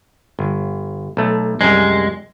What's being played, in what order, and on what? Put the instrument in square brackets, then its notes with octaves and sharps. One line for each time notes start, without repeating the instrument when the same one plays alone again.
[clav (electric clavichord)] G1
B1 A3
[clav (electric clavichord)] C2 F#2 G3 [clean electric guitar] G#3